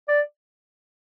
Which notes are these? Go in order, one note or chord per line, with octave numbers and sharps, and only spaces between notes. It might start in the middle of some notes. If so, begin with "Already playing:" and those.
D5